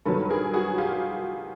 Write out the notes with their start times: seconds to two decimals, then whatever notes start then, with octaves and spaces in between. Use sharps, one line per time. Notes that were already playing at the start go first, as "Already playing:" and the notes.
0.05 G2 D#3 F#3 A4 B4
0.25 B4
0.30 G#4 A#4
0.54 F#4 G#4
0.78 F4 G4